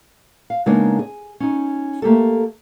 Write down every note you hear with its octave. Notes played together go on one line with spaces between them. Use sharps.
F5
C#3 G#3 A#3 B3 D4 D#4
G#4
C#4 D#4
A3 A#3 G4 A4